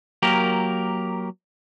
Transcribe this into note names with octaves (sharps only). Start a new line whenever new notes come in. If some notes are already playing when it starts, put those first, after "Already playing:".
F#3 A#3 G4 A#4